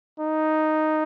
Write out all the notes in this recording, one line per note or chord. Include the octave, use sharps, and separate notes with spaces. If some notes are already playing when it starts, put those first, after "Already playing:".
D#4